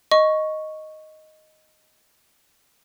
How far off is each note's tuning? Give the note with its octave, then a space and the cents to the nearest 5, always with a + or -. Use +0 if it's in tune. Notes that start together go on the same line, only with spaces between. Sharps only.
D#5 +0 C#6 +0